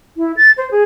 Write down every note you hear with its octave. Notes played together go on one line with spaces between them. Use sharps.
E4
A6
C5
G#4